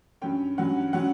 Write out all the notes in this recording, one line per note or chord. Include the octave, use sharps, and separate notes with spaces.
G2 F#3 C#4 G5
G2 F#3 C#4 F#5
F#3 C#4 F#5